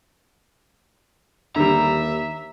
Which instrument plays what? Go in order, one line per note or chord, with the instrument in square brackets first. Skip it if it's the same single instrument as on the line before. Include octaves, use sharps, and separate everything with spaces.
[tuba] D#2 [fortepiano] D3 G3 [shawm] E5 [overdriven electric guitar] A#5